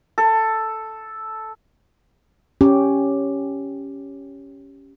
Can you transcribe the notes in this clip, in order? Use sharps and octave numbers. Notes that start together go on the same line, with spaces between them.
A4
C#4 G4